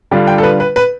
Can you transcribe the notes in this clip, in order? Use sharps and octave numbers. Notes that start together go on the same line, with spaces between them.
D3 G3 D4 F4
G5
A4
B4
B4
B4